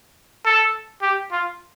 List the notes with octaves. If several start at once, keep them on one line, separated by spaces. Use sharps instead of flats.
A4
G4
F4